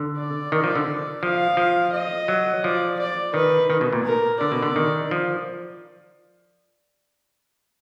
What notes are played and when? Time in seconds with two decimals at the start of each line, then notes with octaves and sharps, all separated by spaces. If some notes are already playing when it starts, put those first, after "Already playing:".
Already playing: D3
0.17 D5
0.52 D#3
0.64 F3
0.75 D3
1.22 F3 F5
1.57 F3
1.92 D#5
2.28 F#3
2.64 F3 D5
2.99 D5
3.34 D#3 B4
3.70 D#3
3.81 B2
3.93 A#2
4.05 A#4
4.40 D3 D5
4.52 B2
4.63 D3
4.76 D#3
5.11 F3